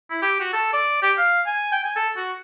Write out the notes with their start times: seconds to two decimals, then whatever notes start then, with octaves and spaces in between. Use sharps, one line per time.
0.11 E4
0.22 G4
0.40 F#4
0.53 A4
0.73 D5
1.02 G4
1.18 F5
1.46 G#5
1.72 G5
1.84 G#5
1.96 A4
2.17 F#4